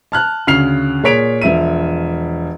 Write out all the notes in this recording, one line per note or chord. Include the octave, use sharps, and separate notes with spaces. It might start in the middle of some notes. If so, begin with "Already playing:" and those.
A5 F6 F#6
D2 C#3 F6 C7 F7
A#2 G#4 C#5 B6 D7 F7
E1 F3 E5 D#7